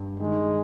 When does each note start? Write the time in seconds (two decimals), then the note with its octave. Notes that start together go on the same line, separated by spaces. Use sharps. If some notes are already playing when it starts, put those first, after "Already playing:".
Already playing: G2
0.20 D#3 G#3